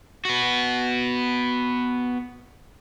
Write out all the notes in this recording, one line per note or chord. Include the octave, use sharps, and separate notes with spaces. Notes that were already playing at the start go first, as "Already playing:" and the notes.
B3 F#4